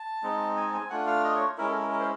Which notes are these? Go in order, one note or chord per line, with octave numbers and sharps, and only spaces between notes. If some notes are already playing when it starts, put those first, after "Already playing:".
Already playing: A5
G#3 C4 D#4
G#5
A5
G#5
A3 D4 F4 F#5
F5
D#5
C#5
G#3 C#4 E4 A#4
A4
A#4
A#4
C5